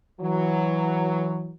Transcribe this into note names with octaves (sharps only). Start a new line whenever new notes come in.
E3 F#3